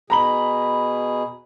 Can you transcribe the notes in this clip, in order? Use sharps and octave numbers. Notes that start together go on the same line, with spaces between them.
B2 G#4 A#5 B5 F#7